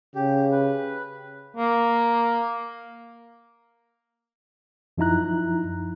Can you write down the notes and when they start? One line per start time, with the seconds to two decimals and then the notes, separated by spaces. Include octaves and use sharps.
0.15 C#3 G4
0.52 B4
1.57 A#3
4.98 F#2 F3 D#4 E4 A#5 F#6